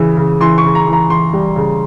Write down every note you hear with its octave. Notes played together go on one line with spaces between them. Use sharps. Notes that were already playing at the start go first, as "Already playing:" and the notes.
Already playing: C#3 E3
C#3
E3 C6
C#6
C#3
A#5
E3
A#5
E3 C6
G3
C#3